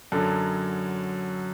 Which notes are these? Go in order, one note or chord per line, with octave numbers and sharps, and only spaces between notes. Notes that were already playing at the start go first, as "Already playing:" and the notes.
F#2 D3 F#3 A4